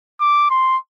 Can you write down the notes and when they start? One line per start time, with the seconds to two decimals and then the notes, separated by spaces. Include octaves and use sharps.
0.21 D6
0.50 C6